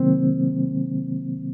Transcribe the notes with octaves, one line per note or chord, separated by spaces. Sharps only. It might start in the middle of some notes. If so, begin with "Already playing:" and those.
Already playing: C3 D#3 F#3 A#3 C4